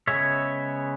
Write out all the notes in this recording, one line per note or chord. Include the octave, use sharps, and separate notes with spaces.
C#3 G#3 B3 C#5 E5